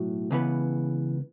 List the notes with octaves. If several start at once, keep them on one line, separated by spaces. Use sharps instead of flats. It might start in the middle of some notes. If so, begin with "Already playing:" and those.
Already playing: B1 A2 F#3
C#2 C#3 E3 B3